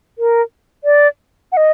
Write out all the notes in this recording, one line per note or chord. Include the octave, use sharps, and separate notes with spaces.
A#4
D5
F#5
D#5